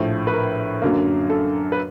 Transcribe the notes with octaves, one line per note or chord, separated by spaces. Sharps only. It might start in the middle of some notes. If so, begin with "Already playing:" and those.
Already playing: A#1 A2 F3
B4
A#4
F#2 D3 F#3 A#3
A4
B4